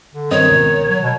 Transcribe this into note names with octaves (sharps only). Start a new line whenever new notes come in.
D3
G2 D#3 C4 C#5 D#5
C#2 B2
F#3
B2